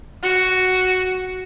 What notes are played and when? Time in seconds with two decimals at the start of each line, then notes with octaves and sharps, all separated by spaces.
0.23 F#4